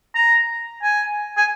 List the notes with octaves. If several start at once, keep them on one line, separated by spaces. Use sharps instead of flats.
A#5
G#5
G#5